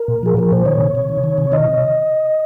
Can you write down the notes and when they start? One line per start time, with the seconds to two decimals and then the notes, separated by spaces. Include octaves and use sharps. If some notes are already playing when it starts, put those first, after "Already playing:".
Already playing: A#4
0.08 A#2
0.23 F3 G#4
0.37 F3 A#4
0.52 A#2 C5
0.65 D#3 C#5
0.80 C3
0.95 C3
1.09 D#3
1.24 D#3
1.38 C3
1.52 D#3 D#5
1.67 C3